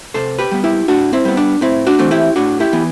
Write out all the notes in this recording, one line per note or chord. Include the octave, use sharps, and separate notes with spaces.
C3 A4 C5
G4 B4
G3 B3
E4 G4
A2 D4 F#4
C4 E4
G3 B3
D4
A2 C4 E4
D4 F#4
E3 A3 C4
E4 G4
A2 D4 F#4
E4 G4
E3 B3